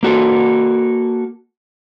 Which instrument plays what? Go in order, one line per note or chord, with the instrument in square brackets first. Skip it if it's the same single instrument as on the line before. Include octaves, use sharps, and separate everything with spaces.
[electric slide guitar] A#3 F#4 A4